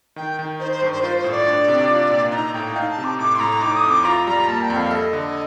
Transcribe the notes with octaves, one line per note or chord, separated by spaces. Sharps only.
D#3 G5
D#3
D#4 C5
C5
G2
C5
F4 C5
C5
A2
D5
D4
C3
F4
A#2
D#4 A#5
A2 G5
D#4 F5
A5
C3
D6
A2 D6
C6
A2 A#5
D#4 D6
D#6
F2
D6
F4 A#5
G3 A#5
A#3 A5
G5
F2
F5
A4 D#5
D3